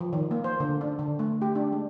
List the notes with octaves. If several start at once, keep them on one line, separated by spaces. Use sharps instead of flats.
F3
D#3
A#3
C5
D3
D4
D3
A3
G4
D4
G#3